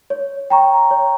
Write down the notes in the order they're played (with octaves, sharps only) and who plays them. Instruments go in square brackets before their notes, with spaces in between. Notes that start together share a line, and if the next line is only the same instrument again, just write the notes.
[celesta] C#5
G5 A#5 C#6
C#5